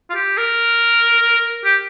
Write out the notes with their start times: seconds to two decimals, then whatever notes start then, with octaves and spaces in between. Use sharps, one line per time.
0.10 F4
0.15 G4
0.37 A#4
1.64 G4